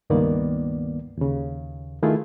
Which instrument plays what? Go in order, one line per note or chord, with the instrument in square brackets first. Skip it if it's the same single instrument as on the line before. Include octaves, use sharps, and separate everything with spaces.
[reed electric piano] C#2 G2 D#3 A#3 B3 D5
D#2 C#3
D#3 A3 E4 F4 G#4